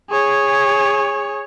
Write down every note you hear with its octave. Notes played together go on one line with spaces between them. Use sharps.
G#4 C#5